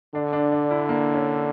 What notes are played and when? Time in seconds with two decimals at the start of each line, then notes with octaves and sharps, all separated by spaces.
0.14 D3 D4
0.33 D4
0.52 D4
0.71 E4
0.89 A#3
1.14 C#4